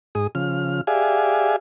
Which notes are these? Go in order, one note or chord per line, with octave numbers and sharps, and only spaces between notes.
G#2 G#4 D#6
C#3 F3 F6
G4 G#4 D5 E5 F5 G#5